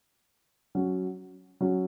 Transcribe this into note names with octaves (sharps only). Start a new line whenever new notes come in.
F#3 C#4 F#4
F#3 C#4 F#4